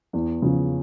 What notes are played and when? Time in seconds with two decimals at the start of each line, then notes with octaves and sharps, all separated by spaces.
0.13 E2
0.42 C#3 F3